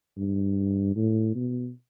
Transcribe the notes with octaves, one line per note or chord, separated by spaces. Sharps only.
G2
A2
B2